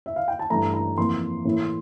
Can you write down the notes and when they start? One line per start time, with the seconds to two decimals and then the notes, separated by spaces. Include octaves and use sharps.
0.06 E5
0.16 F5
0.28 G5
0.39 A5
0.50 G2 E3 A3 A#5
0.74 A#5
0.97 F2 E3 A#3 C6
1.45 A2 E3 A#3